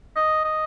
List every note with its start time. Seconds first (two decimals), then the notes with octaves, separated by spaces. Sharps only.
0.16 D#5
0.44 D#5